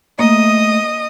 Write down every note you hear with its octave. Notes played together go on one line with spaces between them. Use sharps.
A3 A#3 D#5 D#6